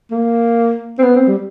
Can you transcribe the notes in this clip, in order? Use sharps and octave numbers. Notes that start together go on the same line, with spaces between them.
A#3
C4
B3
C4
G3